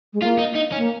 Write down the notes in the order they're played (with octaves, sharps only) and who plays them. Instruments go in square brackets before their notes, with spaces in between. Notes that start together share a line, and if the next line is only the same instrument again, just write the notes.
[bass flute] G#3
[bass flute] A#3 [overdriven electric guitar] F4
[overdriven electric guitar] D#4
D#4
C#4
[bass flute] A#3